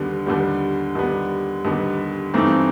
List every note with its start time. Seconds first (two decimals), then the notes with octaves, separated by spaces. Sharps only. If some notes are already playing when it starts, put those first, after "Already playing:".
Already playing: D#2 D3 G3 B3
0.26 D#2 D3 G3 B3
0.95 D#2 D3 G3 B3
1.65 D#2 D3 G3 B3
2.34 G2 E3 A3 C4 D#4